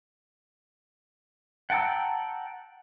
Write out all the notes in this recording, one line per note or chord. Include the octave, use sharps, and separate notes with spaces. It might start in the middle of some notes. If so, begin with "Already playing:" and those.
F#5 G5 A5 A#5 E6